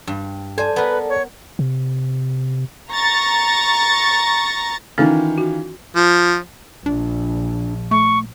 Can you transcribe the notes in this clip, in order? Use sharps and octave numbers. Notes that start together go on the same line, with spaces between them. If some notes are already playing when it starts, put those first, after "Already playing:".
G2
A4 C5 D5 G#5 A5
B3 A#4 B4
C#5
C3
A#5 C#6 A6 A#6
D#3 E3 C#4 D#4 F4 A4
F#4
F3
A#1 D4
A3 C#6